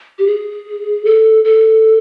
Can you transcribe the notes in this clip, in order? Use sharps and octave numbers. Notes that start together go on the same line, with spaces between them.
G4
G#4
A4
A4